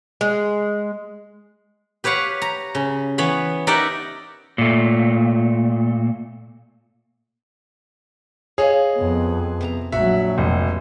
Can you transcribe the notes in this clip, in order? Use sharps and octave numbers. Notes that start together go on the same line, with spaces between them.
G#3
G4 B4 C#5 F5 F#5
A#5
C#3
E3 B3 C#5 B5
D#4 G4 A#4 D5 E5 F#5
A#2 A3
G#4 C#5 D#5 F5
F2 B3
C3 A5 A#5
A#1 F#3 F#4 E5
F1